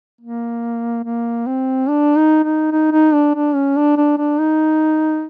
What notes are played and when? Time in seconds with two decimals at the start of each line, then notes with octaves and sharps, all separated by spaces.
0.21 A#3
1.04 A#3
1.47 C4
1.88 D4
2.16 D#4
2.44 D#4
2.71 D#4
2.92 D#4
3.14 D4
3.35 D4
3.55 C#4
3.77 D4
3.97 D4
4.18 D4
4.39 D#4